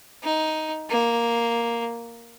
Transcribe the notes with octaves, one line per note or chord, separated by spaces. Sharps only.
D#4
A#3